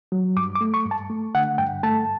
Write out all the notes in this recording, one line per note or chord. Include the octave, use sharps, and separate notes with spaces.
F#3
G2 D6
D6
A3
C#6
G2
A5
A3
D3 F#5
G2 G5
A3 A5